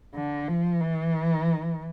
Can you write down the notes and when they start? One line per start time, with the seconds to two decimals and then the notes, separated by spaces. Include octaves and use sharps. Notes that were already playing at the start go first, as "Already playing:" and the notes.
0.15 D3
0.48 F3
0.80 E3